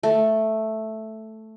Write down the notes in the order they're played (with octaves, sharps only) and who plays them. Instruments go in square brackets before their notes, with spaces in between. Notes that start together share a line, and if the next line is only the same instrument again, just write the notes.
[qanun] A3